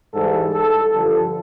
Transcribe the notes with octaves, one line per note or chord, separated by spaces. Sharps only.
G#2 E3 G3 A4
A4
G2 D3 F3 A4